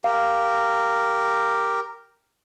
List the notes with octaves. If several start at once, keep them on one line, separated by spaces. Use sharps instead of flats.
G4 A#4 F5